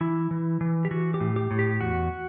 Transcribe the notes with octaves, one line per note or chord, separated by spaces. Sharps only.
E3 E4
E3
E3
G4
E3 F#4
G4
A2
G4
A2
G4
E2 F#4